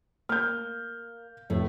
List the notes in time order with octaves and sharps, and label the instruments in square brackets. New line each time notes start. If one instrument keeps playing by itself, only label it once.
[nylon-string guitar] A#3 [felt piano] F6 G6
[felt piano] F1 [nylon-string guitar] A2 A3